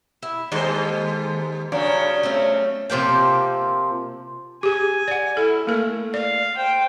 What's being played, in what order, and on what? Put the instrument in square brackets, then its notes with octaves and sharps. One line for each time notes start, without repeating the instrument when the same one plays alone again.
[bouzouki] E4
[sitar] D#2 C5 [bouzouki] G#3 A4 D#5
[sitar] G2 C#3 F#3 [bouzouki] D5
[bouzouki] A3 C4 C#4
C3 F3 A#3 G5
[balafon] G4 G#4 [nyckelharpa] G#5
[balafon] D5 F#5
[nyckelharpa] E4 [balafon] A4
[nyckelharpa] A3 [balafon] A#3 A#4
[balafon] D5 [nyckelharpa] F5
[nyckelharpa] C5 G5